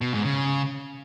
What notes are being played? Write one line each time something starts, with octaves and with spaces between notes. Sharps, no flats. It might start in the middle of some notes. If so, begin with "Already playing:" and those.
B2
G#2
C#3